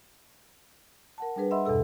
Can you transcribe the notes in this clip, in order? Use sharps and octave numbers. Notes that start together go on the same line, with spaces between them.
A#4 F#5 A5
G3 D4 G#4 B4
D#5 E5 F#5 B5 C6 E6
E2 G2 B2 A4 E6